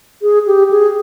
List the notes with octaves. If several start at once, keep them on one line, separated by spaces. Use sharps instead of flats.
G#4
G4
G#4